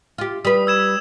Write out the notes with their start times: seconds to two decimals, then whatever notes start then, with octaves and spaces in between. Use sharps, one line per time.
0.18 F4 G4
0.45 G3 B4 D#6
0.67 E6 G#6 E7